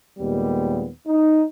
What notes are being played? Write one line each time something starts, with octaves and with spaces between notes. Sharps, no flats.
D#2 A#2 G3 G#3 B3
D#4